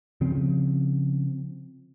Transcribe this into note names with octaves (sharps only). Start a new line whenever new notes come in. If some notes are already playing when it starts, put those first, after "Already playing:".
C#3 F3 C4